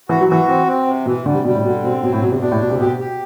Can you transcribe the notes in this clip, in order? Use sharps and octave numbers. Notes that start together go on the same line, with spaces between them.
E3 F#4
F#3
E3 F#4
C4
C4
C3
B2 E3
D3 G3
C3
B2 G3
A2
B2 D3
B2 C4
B2 F#3
A2
E2 B2
C3
B2 D4
A2
D2 B2
C3
B2 G4
G4